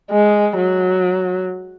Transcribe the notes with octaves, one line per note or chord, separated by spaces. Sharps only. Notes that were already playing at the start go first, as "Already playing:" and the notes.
G#3
F#3